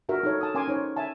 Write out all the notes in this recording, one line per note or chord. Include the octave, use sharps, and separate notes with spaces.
D4 F4 F#4 A#4 E5
D#4 A4 C#5
A5 D#6
C#4 A#4 G#5 C6 D6
D#4 C5 C#5
E5 G#5 A5